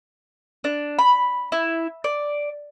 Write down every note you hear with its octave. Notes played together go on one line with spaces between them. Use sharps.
D4
B5
E4
D5